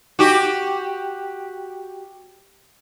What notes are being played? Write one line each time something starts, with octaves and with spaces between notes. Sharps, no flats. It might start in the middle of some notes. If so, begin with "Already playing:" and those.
F#4 G4